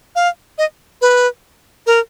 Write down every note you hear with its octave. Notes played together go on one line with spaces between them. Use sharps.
F5
D#5
B4
A#4